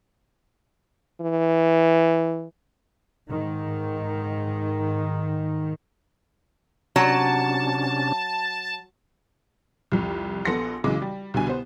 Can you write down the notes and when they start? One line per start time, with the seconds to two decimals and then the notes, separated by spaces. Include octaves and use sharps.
1.21 E3
3.28 G#2 D#3
6.96 C3 F#3 C#4 D4 A5
9.92 C2 F2
10.45 A#1 B3 A4 C6 A#6 C#7
10.84 B1 C#3 E3 F#3 G#3 D6
11.02 G3
11.34 C2 B2 D3 G#5
11.47 B3 C5